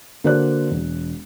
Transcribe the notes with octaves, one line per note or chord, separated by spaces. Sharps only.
D3 A#3 F#4 C5 D5 F#6
E1